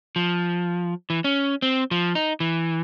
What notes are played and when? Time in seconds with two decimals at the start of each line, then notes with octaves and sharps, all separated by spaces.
0.16 F3
1.10 E3
1.24 C#4
1.62 C4
1.91 F3
2.15 D#4
2.40 E3